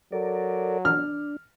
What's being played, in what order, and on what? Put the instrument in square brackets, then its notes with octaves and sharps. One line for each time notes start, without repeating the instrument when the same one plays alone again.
[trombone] F#3 [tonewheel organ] A4 A#4 D5
[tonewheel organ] D4 [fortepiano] F6